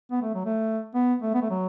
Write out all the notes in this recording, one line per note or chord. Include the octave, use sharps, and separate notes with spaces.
B3
A3
F#3
A3
B3
A3
B3
A3
F#3